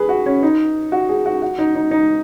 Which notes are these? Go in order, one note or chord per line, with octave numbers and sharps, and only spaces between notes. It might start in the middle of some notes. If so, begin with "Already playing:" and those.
Already playing: G#4 B4
F#4
C#4
D#4
F#4
G#4
F#4
F#4
D#4
D#4
D#4